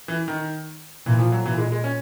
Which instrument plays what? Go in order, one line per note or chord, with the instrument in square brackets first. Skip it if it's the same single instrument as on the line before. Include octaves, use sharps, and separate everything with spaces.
[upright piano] E3
D#3
[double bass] A#2 [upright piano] E3
[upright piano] F3
F#3
[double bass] A#2 [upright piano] E3
[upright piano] G#3
G#3
C#4